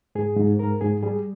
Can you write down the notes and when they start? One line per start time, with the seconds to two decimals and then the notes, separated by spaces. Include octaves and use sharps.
0.15 G#2 G#4
0.37 G#2
0.59 G#2 A#4
0.81 G#2 G#4
1.02 G3 G#4